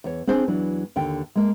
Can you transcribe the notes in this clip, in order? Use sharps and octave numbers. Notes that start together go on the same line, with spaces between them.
E2 C#5
C4 D4 G#4 C5 G#5
E2 E3 F#3 D4
D#2 D3 G5
G#3 A#3